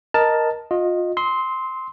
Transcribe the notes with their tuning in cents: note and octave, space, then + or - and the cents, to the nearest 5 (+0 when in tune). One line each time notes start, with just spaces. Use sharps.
A#4 +10 D#5 +0 A5 +5
F4 +30 D#5 +0
C6 +0 E6 -40